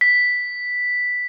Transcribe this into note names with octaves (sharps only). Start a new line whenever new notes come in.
B6